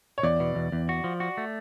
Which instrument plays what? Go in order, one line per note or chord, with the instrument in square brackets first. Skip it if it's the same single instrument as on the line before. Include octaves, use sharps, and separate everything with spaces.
[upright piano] C#5
[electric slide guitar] E2 [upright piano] D5
[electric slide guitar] B2
E2
E2
F#4
F3
F#4
A3